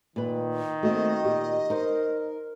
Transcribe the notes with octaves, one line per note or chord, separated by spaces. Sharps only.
A#2 D#3 B4
A3 A#3 C4 F#4 D#5
A#2 G4
D#4 A#4 C5